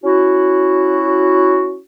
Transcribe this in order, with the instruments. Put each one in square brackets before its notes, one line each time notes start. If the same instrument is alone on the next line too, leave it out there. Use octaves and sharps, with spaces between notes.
[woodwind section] C#4 E4 F#4